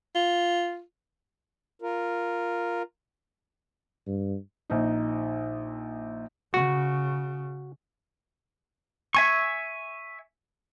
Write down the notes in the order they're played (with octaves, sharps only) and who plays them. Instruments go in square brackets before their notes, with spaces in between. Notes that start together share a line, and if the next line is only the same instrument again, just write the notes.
[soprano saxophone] F4
[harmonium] F4 A#4
[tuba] G2
[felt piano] A#1 D#4
[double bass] C#3 [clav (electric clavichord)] F#4
[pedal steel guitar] E5 G#5 C#6